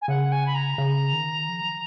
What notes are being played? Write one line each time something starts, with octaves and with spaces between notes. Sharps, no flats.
G#5
C#3 F#5
G#5
B5
A#5
C#3
D#3
F3